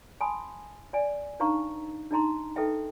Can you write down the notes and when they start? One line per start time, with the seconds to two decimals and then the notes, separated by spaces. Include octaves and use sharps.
0.21 G#5 A5 B5 C6 D#6
0.93 D5 D#5 G#5
1.40 D4 D#4 B4 F5 A#5 C#6
2.11 D4 D#4 D#5 A#5 C6
2.56 D#4 A4 B4 D#5 E5 G5